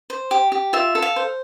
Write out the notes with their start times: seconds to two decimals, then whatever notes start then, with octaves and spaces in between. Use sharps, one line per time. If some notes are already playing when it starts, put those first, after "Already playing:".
0.10 C5
0.31 G4
0.52 G4
0.73 F4 E5
0.95 A4
1.02 F5
1.16 C5